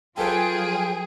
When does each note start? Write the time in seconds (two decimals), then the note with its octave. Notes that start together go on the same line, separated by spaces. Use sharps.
0.18 F#3 F4 G#4 A4 B4 G5